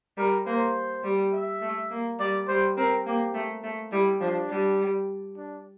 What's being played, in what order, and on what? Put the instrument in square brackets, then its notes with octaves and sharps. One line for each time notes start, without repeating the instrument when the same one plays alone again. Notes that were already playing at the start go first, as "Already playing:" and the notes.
[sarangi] G3 [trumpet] A#4
[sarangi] A#3 [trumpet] C5
[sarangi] G3
[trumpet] E5
[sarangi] A3
A#3
[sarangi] G3 [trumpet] D5
[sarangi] G3 [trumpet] C5
[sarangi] C4 [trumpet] A#4
[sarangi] A#3 [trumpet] G4
[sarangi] A3
A3
[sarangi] G3 [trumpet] E4
[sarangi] F3 [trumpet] D4
[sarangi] G3
[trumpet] D4